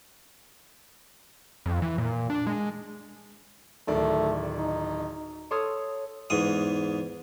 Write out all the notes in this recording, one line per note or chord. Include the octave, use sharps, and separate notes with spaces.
F2
E3
A#2
D4
G#3
D1 D#3 A3 D5
D#4
A4 C#5 C6 D#6 F6
E2 G#2 D#6